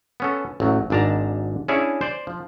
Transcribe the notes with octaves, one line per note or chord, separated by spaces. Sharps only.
B3 C#4 A4
A1 F#3
G#1 G#2 D4 A5 A#5
C#4 D4 E4 G#4 C#5
C5 D5
F3